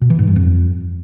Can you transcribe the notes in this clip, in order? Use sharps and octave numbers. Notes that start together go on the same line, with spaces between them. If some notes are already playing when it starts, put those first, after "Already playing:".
B2
E3
G#2
G2
F2